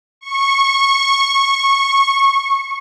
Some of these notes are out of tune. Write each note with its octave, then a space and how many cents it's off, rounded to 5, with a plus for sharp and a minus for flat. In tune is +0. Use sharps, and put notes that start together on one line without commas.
C#6 -15